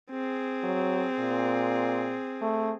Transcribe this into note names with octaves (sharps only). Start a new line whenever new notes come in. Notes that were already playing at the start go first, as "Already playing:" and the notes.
C4 G#4
F#3
A#2
A3